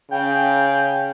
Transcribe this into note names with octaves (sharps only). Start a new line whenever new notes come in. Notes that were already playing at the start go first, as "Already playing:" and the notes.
C#3 G5